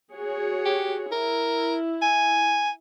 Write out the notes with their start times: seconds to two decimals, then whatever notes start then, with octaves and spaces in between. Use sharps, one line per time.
0.14 F#4 G#4 C#5
0.65 G4
1.12 E4 A#4
2.02 G#5